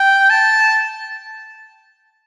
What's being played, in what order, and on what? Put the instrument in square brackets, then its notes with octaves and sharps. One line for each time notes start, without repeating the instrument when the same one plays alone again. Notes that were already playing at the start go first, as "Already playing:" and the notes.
Already playing: [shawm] G5
A5